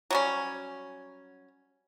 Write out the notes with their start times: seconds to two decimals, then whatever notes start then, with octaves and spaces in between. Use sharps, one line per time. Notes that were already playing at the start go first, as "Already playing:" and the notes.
0.10 F#3 G3 C#4